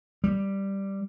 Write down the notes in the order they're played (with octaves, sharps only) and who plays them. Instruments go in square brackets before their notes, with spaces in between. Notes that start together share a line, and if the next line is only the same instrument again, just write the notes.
[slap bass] G3